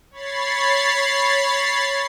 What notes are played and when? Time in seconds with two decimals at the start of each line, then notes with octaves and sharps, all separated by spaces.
0.11 C#5 B5 A6 C7